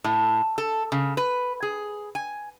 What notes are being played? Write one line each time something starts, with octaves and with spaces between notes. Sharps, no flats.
A2
A4
C#3
B4
G#4
G#5